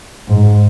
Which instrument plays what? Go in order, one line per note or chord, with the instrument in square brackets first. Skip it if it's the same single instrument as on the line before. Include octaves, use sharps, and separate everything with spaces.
[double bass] G#2